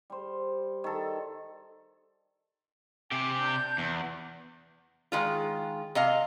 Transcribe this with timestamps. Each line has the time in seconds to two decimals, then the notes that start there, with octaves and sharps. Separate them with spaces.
0.10 G3 C5
0.84 D#3 A4
3.11 C3 G4 G#5
3.35 D4 G6
3.78 E2
5.12 D#3 G#3 F4
5.95 C3 D#5 F5